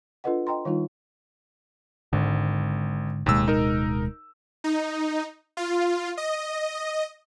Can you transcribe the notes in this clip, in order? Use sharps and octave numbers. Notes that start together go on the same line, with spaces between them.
D4 F4 A4 B4 D#5 F#5
D#5 G5 A#5 C6
D#3 G3 D#4 F4
G#1 G#2 D3
D1 D#2 B2 G#3 E6
D#4 A#4
D#4
F4
D#5